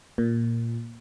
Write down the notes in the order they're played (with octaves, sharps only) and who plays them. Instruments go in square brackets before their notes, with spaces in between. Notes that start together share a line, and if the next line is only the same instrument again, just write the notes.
[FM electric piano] A#2